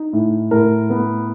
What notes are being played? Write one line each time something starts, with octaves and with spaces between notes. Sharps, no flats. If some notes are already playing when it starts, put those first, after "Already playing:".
Already playing: D#4
A2
A2 A#4
B3